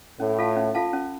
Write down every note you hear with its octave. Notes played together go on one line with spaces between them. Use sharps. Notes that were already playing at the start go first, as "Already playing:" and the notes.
A2 C#4
F4 A4 F5 A5
C#4
F4 A4 F5 A5
C#4